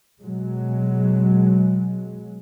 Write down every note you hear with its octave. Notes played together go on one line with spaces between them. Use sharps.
B2 F#3 G#3